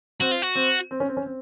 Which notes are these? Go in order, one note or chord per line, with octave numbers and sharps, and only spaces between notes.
C4 F#4
F4
F#4
C4
C4
C#4
C4
C#4
C4